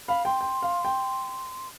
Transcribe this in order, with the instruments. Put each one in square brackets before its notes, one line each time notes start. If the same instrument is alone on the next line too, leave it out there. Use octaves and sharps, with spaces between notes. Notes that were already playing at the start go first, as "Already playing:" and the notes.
[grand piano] F5 [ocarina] B5
[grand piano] G5 [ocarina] C6
[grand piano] G5
F5
G5